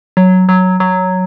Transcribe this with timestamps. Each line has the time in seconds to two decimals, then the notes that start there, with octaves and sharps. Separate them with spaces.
0.17 F#3
0.49 F#3
0.80 F#3